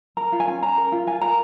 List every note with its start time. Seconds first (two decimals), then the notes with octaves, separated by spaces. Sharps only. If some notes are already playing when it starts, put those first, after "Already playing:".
0.17 A#4 A#5
0.32 F4
0.40 G#5
0.48 C#4
0.62 C#4 A#5
0.77 A#4
0.92 F4
1.07 F4 G#5
1.21 A#4 A#5